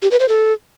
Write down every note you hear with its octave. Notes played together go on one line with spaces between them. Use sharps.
G4
B4
C5
A4